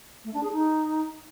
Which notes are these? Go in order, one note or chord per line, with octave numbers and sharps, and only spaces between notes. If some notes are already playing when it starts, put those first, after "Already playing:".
A3
D4
G#4
D#4